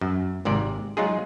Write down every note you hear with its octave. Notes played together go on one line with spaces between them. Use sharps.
F#2
G#1 G#2 C3 D5
F#3 G#3 D#4 F4 G#4